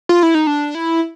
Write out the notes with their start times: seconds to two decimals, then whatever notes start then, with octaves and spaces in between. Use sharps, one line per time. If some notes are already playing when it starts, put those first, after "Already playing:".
0.09 F4
0.23 E4
0.35 D#4
0.47 D4
0.75 E4